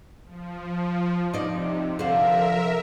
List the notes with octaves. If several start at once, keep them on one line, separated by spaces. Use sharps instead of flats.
F3
C3 D#4 D5
D3 F3 A#4 E5